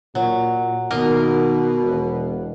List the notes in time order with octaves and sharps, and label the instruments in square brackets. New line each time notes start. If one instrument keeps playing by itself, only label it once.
[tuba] A#2 [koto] F#3
[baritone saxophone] B2 [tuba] D#3 [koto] A#3 A#4 D#5
[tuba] E1